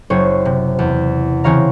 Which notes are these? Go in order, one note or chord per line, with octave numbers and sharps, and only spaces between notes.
F#1 C5 C#5
C3
E2
C#3 E3 C4 C#5 F5 A#5